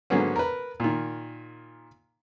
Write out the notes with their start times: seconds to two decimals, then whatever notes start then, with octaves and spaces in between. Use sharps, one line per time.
0.10 G#2 D3 F#3 A#3 B3 C#4
0.36 A#4 B4
0.80 A#2 D#3